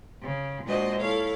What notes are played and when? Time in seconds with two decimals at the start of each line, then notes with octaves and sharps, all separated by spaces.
0.21 C#3
0.64 A#2 G#3 D4 F#4 C5 D#5
1.00 E4 A4 C#5 F5